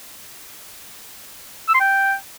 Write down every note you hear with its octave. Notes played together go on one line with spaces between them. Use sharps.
E6
C6
G5